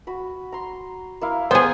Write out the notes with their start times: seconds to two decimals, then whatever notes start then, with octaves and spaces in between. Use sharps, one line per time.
0.07 F#4 B5
0.52 A#5 C6
1.21 A#3 E4 F5
1.51 B3 G#4 C5 G#5